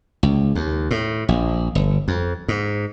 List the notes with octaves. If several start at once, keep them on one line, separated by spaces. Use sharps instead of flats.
C#2
D#2
A2
A#1
G1
F2
G#2